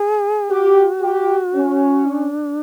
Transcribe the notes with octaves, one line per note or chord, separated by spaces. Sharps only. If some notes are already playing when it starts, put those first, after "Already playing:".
Already playing: G#4
F#4 G4
G4
C#4
D4